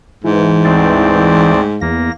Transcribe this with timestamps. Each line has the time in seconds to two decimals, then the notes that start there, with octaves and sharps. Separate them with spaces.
0.24 G#2 E3
0.64 D2 C4 D5
1.81 E2 A#3 A#6